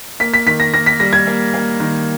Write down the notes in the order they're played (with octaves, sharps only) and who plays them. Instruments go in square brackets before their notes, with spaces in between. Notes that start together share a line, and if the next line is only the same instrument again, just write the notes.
[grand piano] A#3 [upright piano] B6
[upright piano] B6
[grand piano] D#3 [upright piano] B6
[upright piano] A#6
[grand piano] A#3 [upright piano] A#6
[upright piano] B6
[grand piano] G3 [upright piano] A#6
[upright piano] G#6
[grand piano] A#3
A#3
D#3